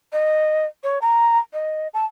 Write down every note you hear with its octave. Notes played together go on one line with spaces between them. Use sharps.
D#5
C#5
A#5
D#5
A5